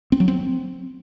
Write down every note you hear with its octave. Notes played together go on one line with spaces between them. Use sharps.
C4
F#3
C4